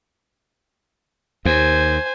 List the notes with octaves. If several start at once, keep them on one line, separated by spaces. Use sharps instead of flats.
D#2 C5 G#5